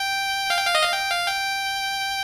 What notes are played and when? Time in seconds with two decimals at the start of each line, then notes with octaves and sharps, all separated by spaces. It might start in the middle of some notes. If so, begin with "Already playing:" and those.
Already playing: G5
0.50 F5
0.57 G5
0.67 F5
0.75 D#5
0.83 F5
0.93 G5
1.10 F5
1.27 G5